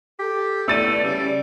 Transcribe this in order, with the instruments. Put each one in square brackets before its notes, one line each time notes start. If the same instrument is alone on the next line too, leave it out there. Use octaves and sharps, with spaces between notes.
[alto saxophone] G4 [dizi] A4
[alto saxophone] A3 [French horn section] B3 E4 D5 [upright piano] E6 A6 D#7
[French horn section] C#3 [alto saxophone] G3 [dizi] D5